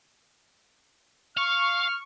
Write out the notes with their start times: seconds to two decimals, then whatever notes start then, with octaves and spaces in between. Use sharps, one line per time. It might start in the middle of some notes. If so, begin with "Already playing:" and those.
1.37 F5 C#6 F6